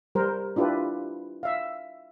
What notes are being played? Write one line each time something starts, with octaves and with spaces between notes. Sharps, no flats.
G3 A#4 C5
D4 E4 F4 G4 B4
E5 F5